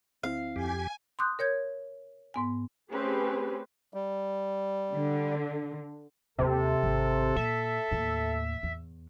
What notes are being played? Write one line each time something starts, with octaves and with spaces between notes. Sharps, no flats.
D2 C4 E4 F5
F2 G4 G#5
C6 D6 D#6 F#6 G6
A#4 C#5 G6 G#6
G#2 B3 G#5
A3 C4 C#4 G4 G#4 B4
G3
D3
D#2 C3 G#3 A4
G#1
A#2 E5
D#2 A2
E2